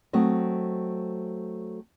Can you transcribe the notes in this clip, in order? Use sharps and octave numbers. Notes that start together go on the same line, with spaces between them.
F#3 A3 C4 D#5